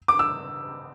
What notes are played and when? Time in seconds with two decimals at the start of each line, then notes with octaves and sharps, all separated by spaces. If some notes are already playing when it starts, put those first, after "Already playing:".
0.08 D6
0.19 E6